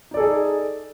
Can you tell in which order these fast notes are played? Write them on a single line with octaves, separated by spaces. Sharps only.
D#4 D5 A4 G#4